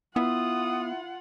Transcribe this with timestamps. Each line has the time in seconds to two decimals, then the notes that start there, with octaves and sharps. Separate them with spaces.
0.16 B3 E4 F4 F#5 D#6